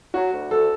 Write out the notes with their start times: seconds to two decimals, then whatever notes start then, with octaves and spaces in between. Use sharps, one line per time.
0.14 F#3 F#4
0.33 D2
0.51 D2 A4